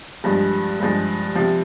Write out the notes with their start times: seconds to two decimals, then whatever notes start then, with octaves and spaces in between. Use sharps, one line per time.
0.24 G2 F3 G#3
0.80 G2 F3 G#3
1.35 C3 F3